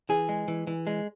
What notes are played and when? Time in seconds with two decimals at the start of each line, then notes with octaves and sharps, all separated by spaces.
0.09 E3 G#4
0.29 G#3
0.48 E3
0.67 E3
0.87 G#3